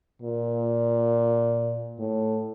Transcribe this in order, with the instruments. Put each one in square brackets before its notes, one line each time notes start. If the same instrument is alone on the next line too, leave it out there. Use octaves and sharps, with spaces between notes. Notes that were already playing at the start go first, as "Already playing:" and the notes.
[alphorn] A#2
A2